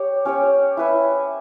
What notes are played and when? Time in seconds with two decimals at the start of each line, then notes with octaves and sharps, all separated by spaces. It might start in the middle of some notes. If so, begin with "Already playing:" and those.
Already playing: G4 C#5
0.25 C#4 G4 C#5
0.77 E4 B4 E5